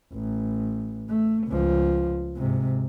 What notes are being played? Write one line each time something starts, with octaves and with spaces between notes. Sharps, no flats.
A1
A3
C#2 F3
G#2 C3